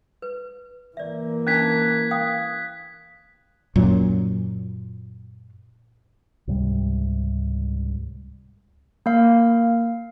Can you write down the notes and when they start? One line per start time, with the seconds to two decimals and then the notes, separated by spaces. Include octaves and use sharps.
0.22 B4
0.97 E3 A#3 D5 E5
1.47 C#4 D4 A5 F#6 G#6 B6
2.11 F5 G5 D#6
3.76 F#2 A#2 F#3
6.47 C#2 G#2 C3 G3
9.06 A#3 F5